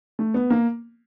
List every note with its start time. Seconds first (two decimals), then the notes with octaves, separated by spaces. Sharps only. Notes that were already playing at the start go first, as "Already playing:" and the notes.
0.19 A3
0.34 B3
0.50 A#3